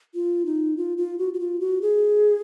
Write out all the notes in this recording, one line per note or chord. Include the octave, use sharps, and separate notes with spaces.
F4
D#4
F4
F4
F#4
F#4
F4
F#4
G#4